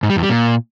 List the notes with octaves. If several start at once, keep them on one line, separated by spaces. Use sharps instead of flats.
G#2
G3
E2
G3
A#2